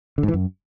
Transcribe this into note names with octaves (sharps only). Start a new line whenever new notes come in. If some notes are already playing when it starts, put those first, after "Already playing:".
D3
G#2
E3
F#2